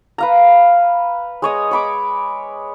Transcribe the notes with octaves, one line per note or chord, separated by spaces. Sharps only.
B4 F5 A#5
G#3 C#5 D#5
C#5 B5 D6